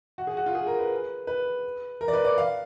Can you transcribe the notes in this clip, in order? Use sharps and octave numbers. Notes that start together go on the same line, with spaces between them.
F#4
G#4
F#4
F4
G#4
A#4
B4
B4
A#4
D5
B4
D5
F5